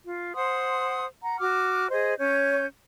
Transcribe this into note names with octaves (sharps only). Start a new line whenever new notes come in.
F4
C5 F#5 C6 D#6
F#5 A#5
F#4 D6 F6
G#4 C5 D#5
C#4 C#5 G6